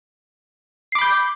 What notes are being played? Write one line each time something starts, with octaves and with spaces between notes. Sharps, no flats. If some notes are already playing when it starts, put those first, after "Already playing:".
B5 D6 G6 C7